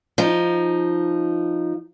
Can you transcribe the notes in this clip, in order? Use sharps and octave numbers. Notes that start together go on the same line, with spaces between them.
F3 D#4